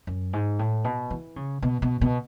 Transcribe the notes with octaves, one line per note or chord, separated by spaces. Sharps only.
F#2
G#2
A2
B2
E3
C#3
B2
B2
B2